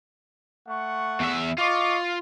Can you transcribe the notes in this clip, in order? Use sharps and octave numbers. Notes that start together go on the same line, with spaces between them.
A3 F#5 C#6
E2 E5
F4 D#5 C#6 D6